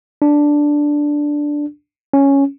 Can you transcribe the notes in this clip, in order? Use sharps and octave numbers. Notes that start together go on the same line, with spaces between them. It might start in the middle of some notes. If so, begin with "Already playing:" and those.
D4
C#4